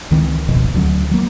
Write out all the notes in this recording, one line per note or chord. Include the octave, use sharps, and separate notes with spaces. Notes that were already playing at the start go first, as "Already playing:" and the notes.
C#2 D#3 E3 C4
D1 G1 F2 B2
D2 D3 F#3 C#4
F#3 A#3